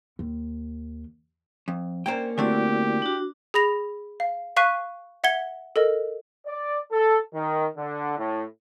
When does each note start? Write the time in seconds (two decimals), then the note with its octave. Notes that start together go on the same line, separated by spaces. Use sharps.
0.19 D#2
1.68 F2
2.06 A#3 C#4 D4 C5 G5
2.38 D3 A3 C4 E4 F#4 G4 D5
3.02 D4 F#4
3.54 G#4 B5 A#6 F7
4.20 F5
4.57 F5 C#6 F#6 B6 D#7
5.24 E5 F#5 G#6 G7
5.76 A4 A#4 D#5
6.46 D5
6.91 A4
7.34 D#3
7.76 D3
8.18 A2